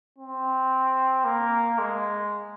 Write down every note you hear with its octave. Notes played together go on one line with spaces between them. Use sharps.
C4
A#3
G#3